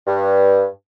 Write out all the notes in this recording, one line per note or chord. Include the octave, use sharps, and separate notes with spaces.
G2